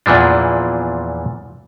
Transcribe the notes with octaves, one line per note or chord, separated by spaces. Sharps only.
E2 A#2 E3 F3 D4